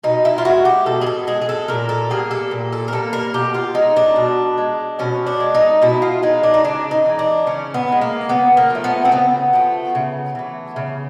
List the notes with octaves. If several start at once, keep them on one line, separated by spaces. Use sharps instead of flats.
B2 D#4
E4
F4
G#3 F#4
G4
B2 A4
G#4
A4
G#3 G#4
G#4
A4
A#2 A#4
A4
G3 A#3 G#4
A4
A#2
A4
A#4
G3 A#3 A4
A#4
B2 G4
F4
G#3 D#4
D4
B2
G#3
B2 C#4
D4
G#3
D#4
B2 E4
F4
G#3 D#4
D4
D#4
C#3 D4
D#4
E3 G#3
D4
C#3 C#4
B3
E3
G#3
A#3
C#3 B3
A#3
F3 A3
B3
C4
C#3 B3
F3 A3
C#3
E3 A3
C#3